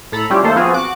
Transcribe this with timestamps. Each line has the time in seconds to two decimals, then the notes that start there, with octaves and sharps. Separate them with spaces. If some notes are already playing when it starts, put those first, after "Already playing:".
0.12 A2 A4 A#5 B5
0.30 G3 C#4 E4 F4 G4
0.43 D#3 A3 A#3 A4 C5
0.56 F3 B3 C4 F4 F#4 G#4
0.74 F#4 D6 F#6